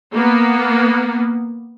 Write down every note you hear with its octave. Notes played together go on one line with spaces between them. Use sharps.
A#3 B3